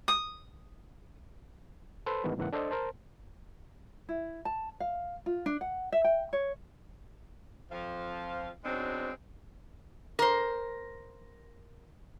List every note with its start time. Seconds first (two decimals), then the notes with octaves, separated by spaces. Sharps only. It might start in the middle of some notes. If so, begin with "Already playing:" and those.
0.08 D#6
2.06 A4 B4 C5 B5 C6
2.24 G2 D#3 E3 G#3 B3 F#4
2.37 E2 G#2 C#3 E3 A#3 F#5
2.53 D4 A4 C5 D#5
2.71 A#4 C5 A5
4.09 E4
4.45 A5
4.80 F5
5.26 F4
5.46 D4
5.61 F#5
5.92 E5
6.04 G5
6.33 C#5
7.71 F2 F3 F5
8.65 G#2 B2 F#3 G#3 C4 D4
10.19 A#4 C5